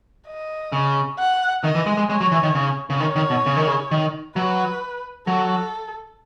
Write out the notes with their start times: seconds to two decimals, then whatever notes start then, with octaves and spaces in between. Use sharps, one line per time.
0.27 D#5
0.72 C#3
1.19 F#5
1.64 D#3 D#5
1.75 E3
1.86 G#3
1.97 G#3
2.10 G#3 C#5
2.21 F#3
2.32 E3
2.43 D#3
2.55 C#3
2.90 C#3
3.00 D#3 C#5
3.16 D#3
3.30 B2
3.46 C#3
3.57 D#3
3.67 C#3
3.91 D#3
4.36 F#3 B4
5.27 F#3 A4